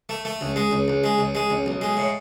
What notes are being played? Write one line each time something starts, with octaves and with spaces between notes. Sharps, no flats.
A3
A3
C#2
G#3
C#2
C#2
G#3
C#2
G#3
C#2
B1
G#3
A2